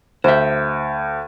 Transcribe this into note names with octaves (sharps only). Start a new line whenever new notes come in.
D2 C5 E5